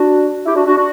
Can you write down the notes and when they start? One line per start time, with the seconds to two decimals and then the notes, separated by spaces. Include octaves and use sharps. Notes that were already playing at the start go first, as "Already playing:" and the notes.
Already playing: D4 F#4
0.45 E4 G4
0.55 D4 F#4
0.65 D4 F#4
0.76 D4 F#4